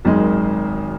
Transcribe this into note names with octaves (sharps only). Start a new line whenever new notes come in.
G#1 F#2 D#3 G#3